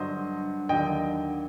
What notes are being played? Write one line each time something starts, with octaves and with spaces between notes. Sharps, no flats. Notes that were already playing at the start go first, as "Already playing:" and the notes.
Already playing: G2 D3 F#3 C5 D#5
D#2 D3 F#3 D#5 G5